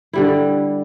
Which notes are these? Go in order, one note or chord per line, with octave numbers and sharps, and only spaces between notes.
D3 G3 E4